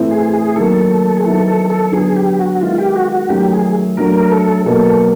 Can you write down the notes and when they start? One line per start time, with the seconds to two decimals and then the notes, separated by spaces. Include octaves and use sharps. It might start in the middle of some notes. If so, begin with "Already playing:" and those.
Already playing: A2 E3 A3 C4 E4
0.11 G#4
0.34 G#4
0.56 D#3 F#3 A#3 A4
1.17 G#4
1.25 D#3 F#3 B3 E4 A4
1.48 A4
1.70 A4
1.92 D3 F#3 B3 G#4
2.16 G4
2.39 F#4
2.61 D#3 G#3 B3 E4 F4
2.78 G4
2.96 F#4
3.13 F#4
3.29 D#3 F#3 A3 C#4 G4
3.52 G#4
3.97 F#3 A3 D4 A#4
4.31 A4
4.66 B2 F#3 A#3 A4